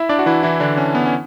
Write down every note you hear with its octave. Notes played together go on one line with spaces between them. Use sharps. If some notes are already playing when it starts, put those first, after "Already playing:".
Already playing: E4 E5
D4 D5
F#4
E3 E4
E3 E4
D3 D4
C#4
B3
C#4